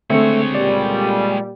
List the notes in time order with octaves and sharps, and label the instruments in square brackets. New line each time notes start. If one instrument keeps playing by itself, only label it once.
[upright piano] D3 C4 C#7 [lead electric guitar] G#3 C#5 [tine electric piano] A3 A4
[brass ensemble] A#2 G3 [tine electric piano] D5